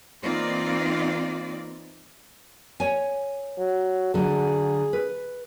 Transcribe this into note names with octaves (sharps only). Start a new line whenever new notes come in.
E3 A#3 C4 D#4 F4 D5
C#5 G#5
F#3
D3 F#3 G#4
B4